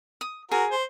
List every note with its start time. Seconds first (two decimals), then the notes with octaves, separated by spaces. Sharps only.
0.21 D#6
0.51 F#4 G#4 A#4
0.71 C5